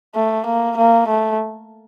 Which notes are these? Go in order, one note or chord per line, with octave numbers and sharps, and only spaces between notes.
A3
A#3
A#3
A3